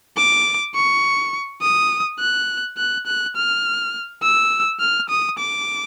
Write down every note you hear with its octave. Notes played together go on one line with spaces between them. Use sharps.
D6
C#6
D#6
F#6
F#6
F#6
F6
E6
F6
D#6
D6